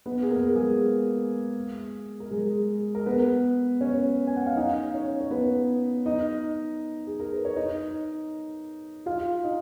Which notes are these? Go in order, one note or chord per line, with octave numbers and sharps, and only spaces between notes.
B3 B4
G#4
A#3 A#4
G#3 G#4
A#4
G#3 G#4
A#4
B3 B4
C#4 C#5
G#5
F#5
F5
D#4 D#5
C#4 C#5
C#5
B3 B4
D#4 D#5
G#4
A#4
B4
C#5
D#4 D#5
F4 F5
D#4 D#5